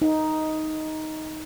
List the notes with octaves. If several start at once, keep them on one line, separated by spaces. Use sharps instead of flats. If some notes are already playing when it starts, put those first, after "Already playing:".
D#4